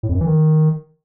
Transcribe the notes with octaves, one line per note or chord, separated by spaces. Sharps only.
A2
F2
F#2
E3
D#3